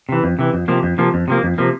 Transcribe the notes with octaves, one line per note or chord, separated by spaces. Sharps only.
C3 E3
F2
C3 E3
F2
C3 F3 A#3
F2
C3 F3 A#3
F2
C3 F3 A#3
F2
C3 F3 A#3